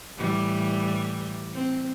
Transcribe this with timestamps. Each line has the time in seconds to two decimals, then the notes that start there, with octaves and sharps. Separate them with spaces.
0.17 A2 E3 G3
1.54 C4